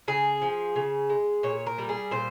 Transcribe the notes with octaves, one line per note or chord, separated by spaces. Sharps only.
C#3 G#4
F3
C#3
G#3
A#2 C#5
A#4
G3
G#4
A#2 C5